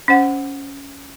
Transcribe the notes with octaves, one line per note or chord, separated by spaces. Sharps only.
C#4 C5 F#5